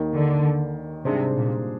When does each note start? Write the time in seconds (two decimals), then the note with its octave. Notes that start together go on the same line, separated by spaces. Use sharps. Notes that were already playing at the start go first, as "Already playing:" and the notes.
Already playing: D#2 D#3 A#3
0.14 D3
1.05 G#2 C3 G3 D4 G#4 C5
1.36 A#2